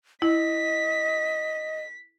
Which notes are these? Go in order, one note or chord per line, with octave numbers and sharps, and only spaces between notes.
E4 D#5 B6